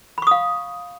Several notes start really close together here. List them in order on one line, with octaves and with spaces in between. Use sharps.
B5 C#6 D#6 F5